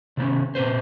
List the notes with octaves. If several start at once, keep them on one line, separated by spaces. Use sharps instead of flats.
C3 D#3 B3 C#4
A#2 C4 G#4 B4 C5